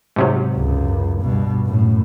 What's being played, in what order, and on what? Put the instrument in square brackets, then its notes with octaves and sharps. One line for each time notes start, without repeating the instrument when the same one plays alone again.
[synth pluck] G#2 C3 F#3
[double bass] C#2 F#2
G2 B2
F#2 A2